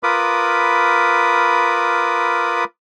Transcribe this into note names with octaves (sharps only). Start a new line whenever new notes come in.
F4 A#4 B4 B5 D6 D#6